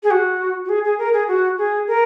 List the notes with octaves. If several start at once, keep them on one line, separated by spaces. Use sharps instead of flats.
G#4
F#4
F#4
G#4
G#4
A#4
G#4
F#4
G#4
A#4